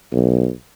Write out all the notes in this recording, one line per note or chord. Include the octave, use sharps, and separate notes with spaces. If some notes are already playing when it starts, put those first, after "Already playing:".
B1